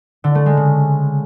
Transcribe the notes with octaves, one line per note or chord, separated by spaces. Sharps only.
D3
A3
G#3
C#3